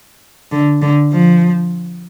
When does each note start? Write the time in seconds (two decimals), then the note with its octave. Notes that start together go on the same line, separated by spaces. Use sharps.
0.52 D3
0.82 D3
1.13 F3